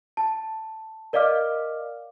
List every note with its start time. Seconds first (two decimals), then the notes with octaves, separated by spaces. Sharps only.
0.17 A5
1.13 A#4 D5 D#5 F5 D6 F6